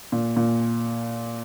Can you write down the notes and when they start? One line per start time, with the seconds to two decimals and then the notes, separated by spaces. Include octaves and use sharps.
0.12 A#2
0.36 A#2